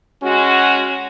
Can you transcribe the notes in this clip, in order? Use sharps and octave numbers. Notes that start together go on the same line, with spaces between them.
G#3 C#4 F#4